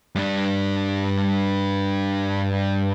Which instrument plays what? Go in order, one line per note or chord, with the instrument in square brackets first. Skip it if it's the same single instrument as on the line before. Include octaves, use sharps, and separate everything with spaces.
[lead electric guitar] G2 D4